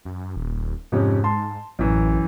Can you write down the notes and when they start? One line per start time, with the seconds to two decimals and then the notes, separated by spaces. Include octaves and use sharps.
0.05 F#2
0.36 D#1
0.92 F2 G#2 C3 C#4
1.24 A5 C6
1.79 A1 F#2 E3